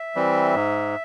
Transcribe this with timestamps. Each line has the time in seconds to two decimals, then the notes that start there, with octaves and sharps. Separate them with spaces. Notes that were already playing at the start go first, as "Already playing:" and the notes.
Already playing: E5
0.15 E3 G3 C4
0.55 G#2